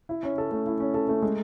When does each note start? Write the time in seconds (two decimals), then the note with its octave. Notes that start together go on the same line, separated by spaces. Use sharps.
0.09 E4
0.23 C#4
0.38 A4
0.51 A3
0.67 E4
0.80 C#4
0.94 A4
1.09 A3
1.22 G#3